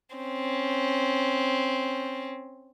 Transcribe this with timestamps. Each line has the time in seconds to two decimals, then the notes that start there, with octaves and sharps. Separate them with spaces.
0.16 C4 C#4